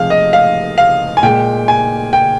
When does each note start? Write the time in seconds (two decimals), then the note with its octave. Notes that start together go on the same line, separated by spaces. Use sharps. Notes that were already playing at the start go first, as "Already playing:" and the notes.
Already playing: C3 F3 G#3 F5
0.10 D#5
0.33 F5
0.78 F5
1.17 G#5
1.23 A#2 G#3 G5
1.68 G#5
2.13 G5